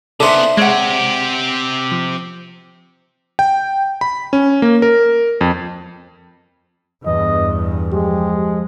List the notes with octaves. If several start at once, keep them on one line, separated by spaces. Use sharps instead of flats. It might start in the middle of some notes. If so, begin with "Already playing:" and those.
C#3 B3 D4 D#4 A4 C5 D5 E5
G#3 C4 G4 C#5 F#5
F3
G5
B5
C#4
A#3
A#4
F2
E2 G2 E3 D#5
F3 G#3 G4